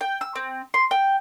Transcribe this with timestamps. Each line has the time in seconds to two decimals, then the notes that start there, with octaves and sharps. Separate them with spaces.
0.01 G5
0.21 E6
0.35 C4
0.74 C6
0.91 G5